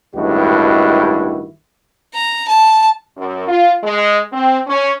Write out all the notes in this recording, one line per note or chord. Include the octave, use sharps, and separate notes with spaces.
A1 G2 D#3 G#3 E4 F#4
A#5
A5
F#2
F4
G#3
C4
C#4